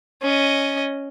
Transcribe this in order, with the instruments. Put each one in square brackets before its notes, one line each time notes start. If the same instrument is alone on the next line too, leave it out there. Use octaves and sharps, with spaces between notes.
[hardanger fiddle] C#4 D#5